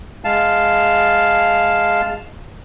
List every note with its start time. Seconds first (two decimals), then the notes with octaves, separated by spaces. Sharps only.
0.25 G#3 F5 A5